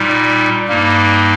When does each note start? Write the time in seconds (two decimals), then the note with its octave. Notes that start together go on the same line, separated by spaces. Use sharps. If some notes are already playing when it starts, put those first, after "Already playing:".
Already playing: A#2 G3 D#4
0.68 G2 G3 A#3 D#4